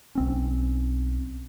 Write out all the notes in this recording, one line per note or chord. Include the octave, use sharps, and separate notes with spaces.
B1 C4 C#4